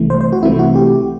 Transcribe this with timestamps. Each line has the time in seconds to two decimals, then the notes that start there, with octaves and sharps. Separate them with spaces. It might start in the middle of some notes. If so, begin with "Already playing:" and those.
Already playing: C2 C3 E3 A3
0.10 C5
0.21 C5
0.33 F#4
0.43 C2 C3 E3 A3 E4
0.59 F#4
0.76 G4